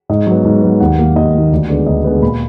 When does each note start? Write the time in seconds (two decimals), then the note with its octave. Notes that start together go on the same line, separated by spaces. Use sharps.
0.09 G#2 D#5
0.27 F#3 B3
0.45 G#2
0.63 F#3 B3
0.80 D#2 F#5
0.99 D#3 A#3
1.16 D#2 D#5
1.34 D#3 A#3
1.51 D2 D5
1.69 D3 G#3 B3 D5
1.87 D2 D#5
2.04 D3 G#3 B3
2.22 A#2 B5